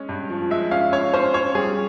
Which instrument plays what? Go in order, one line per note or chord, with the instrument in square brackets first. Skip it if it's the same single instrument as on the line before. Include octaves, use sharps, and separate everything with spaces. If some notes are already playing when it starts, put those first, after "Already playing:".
Already playing: [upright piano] G#3 C#4
G2
F3
G#3 E5
C#4 F5
C#4 C#5
C#4 C5
C#4 C#5
G3 G#4